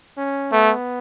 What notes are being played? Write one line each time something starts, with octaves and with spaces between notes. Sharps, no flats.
C#4
A3 B3